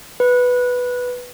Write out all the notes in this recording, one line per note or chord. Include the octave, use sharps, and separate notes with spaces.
B4